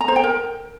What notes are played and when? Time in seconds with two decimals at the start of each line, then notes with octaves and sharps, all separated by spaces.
0.01 A#5
0.08 C5
0.16 G5
0.24 A#4